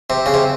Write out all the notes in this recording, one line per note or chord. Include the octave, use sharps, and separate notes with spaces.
C3
C#3
C3